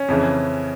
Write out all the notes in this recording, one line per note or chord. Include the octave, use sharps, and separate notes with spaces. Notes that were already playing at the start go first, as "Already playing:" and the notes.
Already playing: C#4
F2 C#3 E3